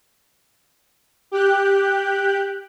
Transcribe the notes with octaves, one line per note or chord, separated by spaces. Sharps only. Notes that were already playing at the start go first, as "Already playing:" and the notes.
G4 F#6 G6